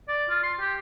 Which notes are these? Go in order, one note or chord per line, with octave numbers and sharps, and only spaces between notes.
D5
F4
C6
G4